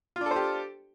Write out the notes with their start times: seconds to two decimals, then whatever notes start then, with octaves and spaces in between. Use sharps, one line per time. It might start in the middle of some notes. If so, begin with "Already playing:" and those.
0.16 F4
0.21 D4
0.26 A4
0.31 C5
0.36 G4